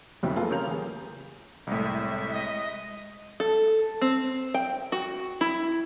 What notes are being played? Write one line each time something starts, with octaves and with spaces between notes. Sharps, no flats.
F1 B1 F2 E4 G5
A#3 F4 G#4 A4 B4
C#3 G4 A#4 C#5 G6 F7
A1 G#4
C2 A2 G#3 E5
D#5
A4
C4
G5
F#4
E4